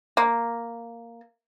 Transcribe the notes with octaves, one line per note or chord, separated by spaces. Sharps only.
A#3